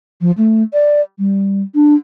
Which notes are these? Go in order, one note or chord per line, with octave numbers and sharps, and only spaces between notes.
F3
A3
D5
G3
D4